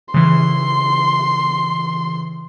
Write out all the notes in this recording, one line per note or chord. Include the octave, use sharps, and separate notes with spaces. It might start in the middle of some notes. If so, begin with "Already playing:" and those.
C#3 E3 C6